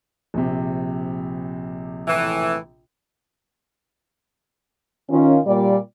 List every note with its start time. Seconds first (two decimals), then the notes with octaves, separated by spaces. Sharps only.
0.34 A#1 C3
2.08 A2 E3
5.10 D#3 C#4 F4
5.46 A#2 G3 D5